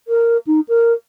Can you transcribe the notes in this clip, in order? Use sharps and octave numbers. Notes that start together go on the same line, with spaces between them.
A#4
D#4
A#4